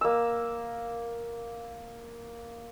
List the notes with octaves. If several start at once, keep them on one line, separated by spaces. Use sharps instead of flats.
A#3 E6